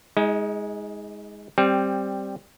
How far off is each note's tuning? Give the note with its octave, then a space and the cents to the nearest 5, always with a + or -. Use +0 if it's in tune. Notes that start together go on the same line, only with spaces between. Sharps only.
G#3 +0 D#4 +40
G3 +0 C4 +10